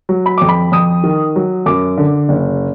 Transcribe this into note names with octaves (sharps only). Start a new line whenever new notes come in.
F#3
B5
F2 D6
B5
F2 D#6
D#3
F#3
F#2 D6
D3
F#1